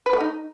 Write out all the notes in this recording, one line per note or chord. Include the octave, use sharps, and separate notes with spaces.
B4
A3
D#4